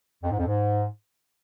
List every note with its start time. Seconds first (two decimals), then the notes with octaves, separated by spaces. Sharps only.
0.23 F2
0.31 G#2
0.39 F2
0.46 G#2